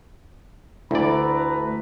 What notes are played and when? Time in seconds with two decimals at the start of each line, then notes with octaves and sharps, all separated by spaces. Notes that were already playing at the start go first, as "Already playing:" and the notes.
0.91 D2 A3 E4 B4 D5 A#5